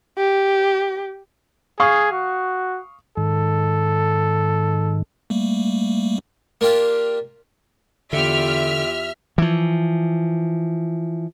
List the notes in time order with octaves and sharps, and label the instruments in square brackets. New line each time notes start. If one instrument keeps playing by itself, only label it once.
[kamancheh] G4
[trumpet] G#4 [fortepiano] F5 C#6 D#6
[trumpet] F#4
[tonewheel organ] G#2 D#3 [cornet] A4
[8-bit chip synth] G3 A3 A#3
[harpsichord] A#3 D4 F4 G4 F5
[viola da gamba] E2 F4 G4 [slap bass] D3 [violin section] E5 F6
[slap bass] E3 F3